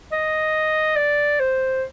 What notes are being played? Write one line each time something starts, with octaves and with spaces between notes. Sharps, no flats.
D#5
D5
C5